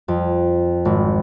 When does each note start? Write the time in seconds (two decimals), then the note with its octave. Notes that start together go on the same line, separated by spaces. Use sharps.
0.08 F2
0.85 G#1